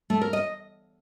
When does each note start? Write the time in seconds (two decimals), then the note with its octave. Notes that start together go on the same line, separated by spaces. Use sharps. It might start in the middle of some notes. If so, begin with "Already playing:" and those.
0.10 A3
0.21 A#4
0.33 D#5